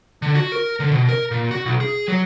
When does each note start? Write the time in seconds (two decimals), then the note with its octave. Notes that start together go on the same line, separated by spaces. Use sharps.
0.22 D3
0.35 F#4
0.52 A#4
0.80 D3
0.92 B2
1.09 A#4
1.31 A#2
1.51 F#4
1.65 B1
1.80 G#4
2.08 F#3